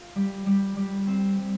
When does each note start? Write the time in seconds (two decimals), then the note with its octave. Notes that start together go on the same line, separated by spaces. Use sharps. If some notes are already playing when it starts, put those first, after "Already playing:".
Already playing: F4
0.15 G3
0.46 G3
0.77 G3
1.07 C4
1.39 G3